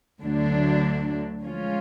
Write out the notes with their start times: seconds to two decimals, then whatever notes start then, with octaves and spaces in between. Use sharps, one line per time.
0.20 D2 D3 F#3 A3 D4
1.42 F3 G#3 C#4 F4